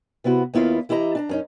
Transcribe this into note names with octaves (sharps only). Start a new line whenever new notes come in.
C3 B3 E4 F#4
D#2 B3 E4 F4 F5
E3 E4 G4 D#5 A#5
D4 A5 A#5
F#2 C#4 D#4